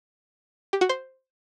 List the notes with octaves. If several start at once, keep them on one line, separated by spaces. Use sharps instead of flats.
G4
F#4
C5